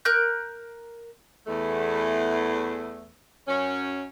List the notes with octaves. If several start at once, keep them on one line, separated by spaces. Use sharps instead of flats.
A#4 F#6 G6
E2 A3
F#2 C#4